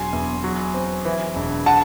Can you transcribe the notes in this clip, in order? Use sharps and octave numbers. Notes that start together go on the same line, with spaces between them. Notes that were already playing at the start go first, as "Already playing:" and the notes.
Already playing: E1 F#3 G#5 C6
E2
F#3
C4
E3
E1
F#5 A5